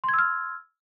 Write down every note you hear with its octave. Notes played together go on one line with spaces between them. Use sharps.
C6 E6 F6 G#6